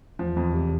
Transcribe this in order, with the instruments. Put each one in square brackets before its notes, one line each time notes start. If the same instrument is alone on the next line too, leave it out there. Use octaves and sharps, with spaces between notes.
[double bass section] E2 [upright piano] F3
[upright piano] F2
C3